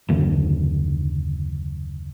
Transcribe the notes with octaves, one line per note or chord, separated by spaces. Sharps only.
F#1 D#2 D3 D4